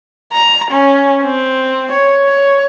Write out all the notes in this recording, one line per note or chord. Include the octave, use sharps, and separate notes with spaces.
A#5
C#4
C4
C#5
C#5